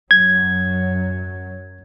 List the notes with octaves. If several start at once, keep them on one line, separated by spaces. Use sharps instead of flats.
F#2 F#3 G#6